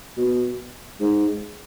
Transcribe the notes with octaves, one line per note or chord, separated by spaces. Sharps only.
B2
G#2